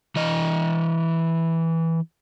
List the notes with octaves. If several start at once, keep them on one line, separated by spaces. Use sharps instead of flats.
E3 D#5